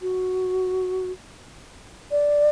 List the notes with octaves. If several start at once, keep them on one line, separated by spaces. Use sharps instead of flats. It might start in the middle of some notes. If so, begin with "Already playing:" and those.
F#4
D5